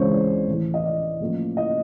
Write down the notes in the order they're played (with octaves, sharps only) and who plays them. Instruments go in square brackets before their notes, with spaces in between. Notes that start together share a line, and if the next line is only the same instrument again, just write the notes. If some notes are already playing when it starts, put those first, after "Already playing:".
Already playing: [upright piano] C#2 C#3 E3 G#3 C4 C5 C#5
D5
A2 E3 A3
D#5
D5
A2 F3 A#3 C#4
D#5